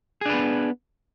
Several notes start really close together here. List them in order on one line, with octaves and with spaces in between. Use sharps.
G#4 D4 B4 B3